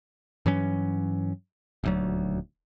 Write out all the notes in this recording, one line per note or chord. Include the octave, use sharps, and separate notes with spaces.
G2 E3 F#3 C#4
D#1 D2 F#3